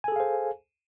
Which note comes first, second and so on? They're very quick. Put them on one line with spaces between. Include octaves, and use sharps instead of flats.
G#5 A4 G#4 F5 C5